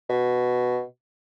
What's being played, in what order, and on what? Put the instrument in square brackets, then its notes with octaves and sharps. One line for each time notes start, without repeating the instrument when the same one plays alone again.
[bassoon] B2